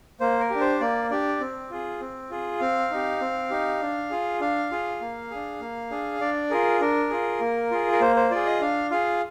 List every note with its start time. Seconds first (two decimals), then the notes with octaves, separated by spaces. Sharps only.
0.20 A#3 C5
0.40 A#4
0.50 D4 G4
0.61 C5
0.81 A#3 D5
1.10 D4 G4 D5
1.40 C4
1.70 F4 G#4
2.00 C4
2.30 F4 G#4
2.60 C4 F5
2.91 D#4 G4
3.20 C4
3.50 D#4 G4
3.81 D4
4.10 F4 G#4
4.40 D4 F5
4.71 F4 G#4
5.01 A#3
5.30 D4 G#4
5.61 A#3
5.91 D4 G#4
6.21 D4 D5
6.50 F4 G#4 A#4
6.81 D4 A#4
7.10 F4 G#4
7.41 A#3
7.71 F4 G#4
7.92 A#4
8.01 A#3 C5
8.16 C5
8.31 F4 G#4 D5
8.46 D#5
8.61 D4 F5
8.91 F4 G#4 F5